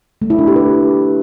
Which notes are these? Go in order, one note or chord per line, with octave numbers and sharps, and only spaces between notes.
A3
E4
D4
G4
B4